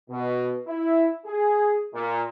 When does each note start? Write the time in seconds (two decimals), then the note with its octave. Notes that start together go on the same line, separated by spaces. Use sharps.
0.10 B2
0.67 E4
1.26 G#4
1.94 A#2